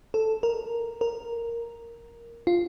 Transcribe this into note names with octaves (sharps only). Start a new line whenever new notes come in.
A4
A#4
A#4
F4